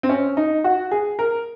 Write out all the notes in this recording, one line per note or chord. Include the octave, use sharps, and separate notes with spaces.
C4
C#4
D#4
F#4
G#4
A#4